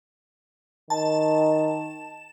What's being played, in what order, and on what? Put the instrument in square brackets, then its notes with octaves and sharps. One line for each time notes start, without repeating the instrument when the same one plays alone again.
[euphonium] D#3 [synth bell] A5